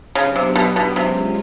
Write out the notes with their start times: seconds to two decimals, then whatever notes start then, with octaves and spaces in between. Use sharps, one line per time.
0.15 C#3 F#3 B3 D4 G4
0.36 C3
0.56 B2
0.76 B2
0.96 C3 G#3 C#4 F4